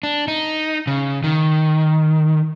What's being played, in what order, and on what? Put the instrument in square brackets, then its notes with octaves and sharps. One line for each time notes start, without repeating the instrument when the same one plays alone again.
[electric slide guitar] D4
D#4
C#3
D#3